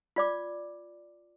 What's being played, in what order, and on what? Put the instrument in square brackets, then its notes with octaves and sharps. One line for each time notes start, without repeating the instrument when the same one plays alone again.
[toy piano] F4 D5 D6